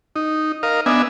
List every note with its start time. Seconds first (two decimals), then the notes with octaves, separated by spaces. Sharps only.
0.16 D#4
0.63 A#4 D#5 F5
0.86 B3 D4 D#5 E5 G#5